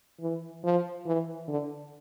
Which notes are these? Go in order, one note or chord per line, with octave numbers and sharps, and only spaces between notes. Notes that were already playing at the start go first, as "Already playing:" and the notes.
E3
F3
E3
D3